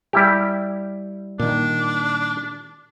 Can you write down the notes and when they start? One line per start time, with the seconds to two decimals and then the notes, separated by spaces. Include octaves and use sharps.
0.13 G3 E4 G4
1.39 A#2 D#3 D4